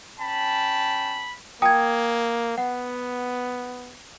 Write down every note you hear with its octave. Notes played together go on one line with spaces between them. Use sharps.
C#4 G5 A5 B5
A#3 G5 A5 D#6 G#6
B3 F#5